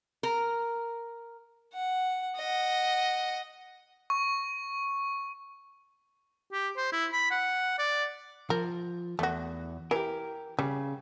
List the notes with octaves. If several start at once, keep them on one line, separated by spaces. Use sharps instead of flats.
A#4
F#5
D#5 F#5
C#6
G4
C5
E4
B5
F#5
D5
F3 A#4
E2 A3 F#4
E3 G4 A#4
C#3 G3